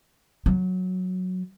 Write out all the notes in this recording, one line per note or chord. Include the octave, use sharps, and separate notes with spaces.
F#3